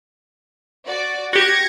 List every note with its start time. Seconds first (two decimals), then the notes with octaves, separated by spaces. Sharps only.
0.87 F#4 D5
1.33 F#4 G4 G#6 A#6 C#7